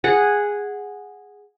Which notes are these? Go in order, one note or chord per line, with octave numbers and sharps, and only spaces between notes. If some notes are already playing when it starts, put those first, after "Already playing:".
G#4 F#5